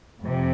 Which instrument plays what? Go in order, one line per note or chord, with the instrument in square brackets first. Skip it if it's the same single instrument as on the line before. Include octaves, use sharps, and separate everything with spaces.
[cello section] F2 C3